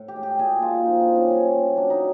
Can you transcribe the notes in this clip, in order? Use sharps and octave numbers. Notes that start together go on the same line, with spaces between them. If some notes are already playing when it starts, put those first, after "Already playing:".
Already playing: A2
G4
G#3
G4
A#2 G#4
A#2 F4
F3 D#4
D4
C3
C#4
G3 C#4
B2
F#3 D4
D#4